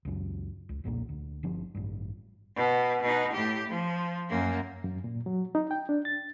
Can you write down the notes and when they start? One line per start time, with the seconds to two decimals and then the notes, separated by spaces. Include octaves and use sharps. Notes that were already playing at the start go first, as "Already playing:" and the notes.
0.05 C#2 F#2
0.69 C#2
0.84 B1 E2 A#2 A#3
1.09 D2
1.43 G1 F3 C4
1.75 A1 G2
2.56 B2
3.01 B2 D#4
3.32 A2 G4
3.68 F3
4.28 F#2 A#3
4.84 F#2
5.04 A#2
5.26 F#3
5.55 D#4
5.71 G5
5.89 D4
6.05 A6